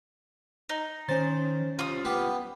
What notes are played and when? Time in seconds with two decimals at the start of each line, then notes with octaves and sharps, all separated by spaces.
0.69 D#4
1.09 D#3 C#4 C5 A6
1.79 G3 F4 C5 D#6
2.05 B3 G4 B4